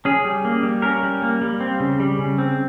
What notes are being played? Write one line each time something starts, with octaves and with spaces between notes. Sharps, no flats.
C#4 G#4
G3
A#3
G3
C#4 A#4
G3
A#3
G3
C4
C#3
G3
C#3
C4